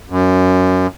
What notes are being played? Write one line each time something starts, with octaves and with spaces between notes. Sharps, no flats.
F#2